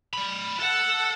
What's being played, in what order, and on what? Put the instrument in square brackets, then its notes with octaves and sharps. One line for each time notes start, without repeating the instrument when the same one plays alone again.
[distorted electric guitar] D5 B5
[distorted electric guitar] A4 A5 [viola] F#5